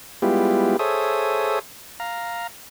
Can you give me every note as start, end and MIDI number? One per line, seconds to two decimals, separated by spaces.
0.22 0.77 55
0.22 0.77 56
0.22 0.77 59
0.22 0.77 64
0.22 0.77 65
0.22 0.77 67
0.79 1.59 68
0.79 1.59 69
0.79 1.59 72
0.79 1.59 73
0.79 1.59 76
0.79 1.59 87
2.00 2.47 77
2.00 2.47 82